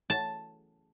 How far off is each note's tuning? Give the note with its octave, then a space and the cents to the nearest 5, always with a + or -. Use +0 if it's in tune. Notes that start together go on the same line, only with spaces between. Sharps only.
A5 +0